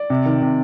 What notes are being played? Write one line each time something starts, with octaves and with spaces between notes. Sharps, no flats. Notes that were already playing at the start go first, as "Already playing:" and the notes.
Already playing: D5
C3
D#3
C3